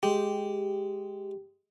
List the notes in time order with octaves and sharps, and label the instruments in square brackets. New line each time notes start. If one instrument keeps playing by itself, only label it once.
[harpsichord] G#3 [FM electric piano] G4